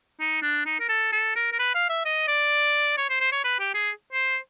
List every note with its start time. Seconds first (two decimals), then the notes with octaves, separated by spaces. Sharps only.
0.20 D#4
0.42 D4
0.66 D#4
0.80 A#4
0.89 A4
1.12 A4
1.36 A#4
1.53 A#4
1.59 B4
1.75 F5
1.89 E5
2.05 D#5
2.28 D5
2.97 C#5
3.09 C5
3.20 C5
3.32 C#5
3.44 B4
3.59 G4
3.74 G#4
4.13 C5